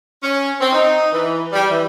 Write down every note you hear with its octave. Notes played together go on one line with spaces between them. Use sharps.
C#4
C4
D#4
E3
G3
E3